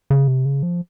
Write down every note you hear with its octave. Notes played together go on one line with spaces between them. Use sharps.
C#3
C3
C#3
F3